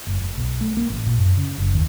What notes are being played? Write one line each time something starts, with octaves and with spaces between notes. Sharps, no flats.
F#1
F1
B1
A3
A#3
A1
A#2
F#2
C#3
F#1
D#2